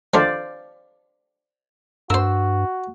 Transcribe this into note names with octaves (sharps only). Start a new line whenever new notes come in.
D3 D#3 F3 C5 D5 F5
G2 F#4 A#4 C5 E6